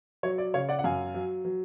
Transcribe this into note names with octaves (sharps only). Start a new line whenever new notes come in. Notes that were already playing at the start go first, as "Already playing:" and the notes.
F#3 C#5
D5
C#3 C#5 F5
D5 F#5
F#5
F#2 F5 G#5
F#3
F#3